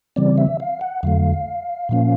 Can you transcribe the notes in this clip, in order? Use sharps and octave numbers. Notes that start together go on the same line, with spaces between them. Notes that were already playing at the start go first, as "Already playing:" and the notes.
C#3 E3 G3 C4 D5
E5
F5
F#5
F2 D3 F#3 A3 F5
A#2 F3 A#3 C#4